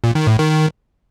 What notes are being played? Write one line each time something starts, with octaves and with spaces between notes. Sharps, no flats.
A#2
D#3
A2
D#3